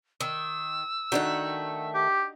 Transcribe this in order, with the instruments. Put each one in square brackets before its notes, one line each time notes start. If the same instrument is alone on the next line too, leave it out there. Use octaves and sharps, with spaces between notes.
[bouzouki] D#3 [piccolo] E6
[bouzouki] D#3 A3 F#5 [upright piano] D4 D#4 F#4
[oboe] G4